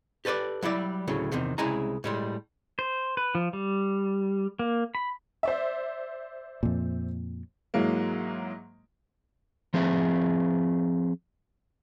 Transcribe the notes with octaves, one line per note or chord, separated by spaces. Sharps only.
G4 A4 B4 C5 D5
F#3 G3 E4 D5
D2 A2 C#3 F#3
E2 C3 D#3
C2 C#3 G#3 E4 G#4 A#5
A2 G3 G#3
C5
B4
F3
G3
A#3
B5
C5 D5 E5
F2 A#2
G#2 E3 F#3 G#3 A#3
F3 C4 G#4 E5